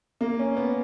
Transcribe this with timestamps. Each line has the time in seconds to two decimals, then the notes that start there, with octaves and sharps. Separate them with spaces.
0.21 A#3
0.39 C#4
0.56 B3